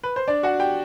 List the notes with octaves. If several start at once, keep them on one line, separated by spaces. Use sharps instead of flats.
B4
C5
D4 D5
F#4 F#5
G4 G5